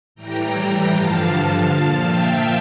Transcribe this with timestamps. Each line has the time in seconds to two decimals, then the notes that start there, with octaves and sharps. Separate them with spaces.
0.15 A2 E3 G3 G5 A#5
0.89 G2 D3 F3 F5 A5
1.64 A#2 F3 F5 A5
2.01 E5 G5